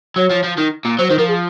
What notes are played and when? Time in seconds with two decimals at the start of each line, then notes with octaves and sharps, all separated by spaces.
0.16 F#3 C#5
0.30 F3
0.44 F3
0.58 D#3
0.85 A#2
0.98 F#3 C5
1.08 D#3 C5
1.19 F3 A#4
1.29 G#4